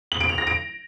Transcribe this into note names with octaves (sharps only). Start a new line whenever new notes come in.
F#7
D7
F7
A#6
D7